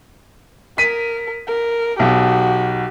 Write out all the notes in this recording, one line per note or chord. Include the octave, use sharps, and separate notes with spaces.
A#4 B6 D#7
A#4
B1 F#4 G4